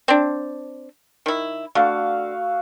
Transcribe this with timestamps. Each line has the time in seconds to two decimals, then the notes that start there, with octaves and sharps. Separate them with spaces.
0.08 C4 D4
1.26 D#3 E4
1.75 D3 A3 F#4 F5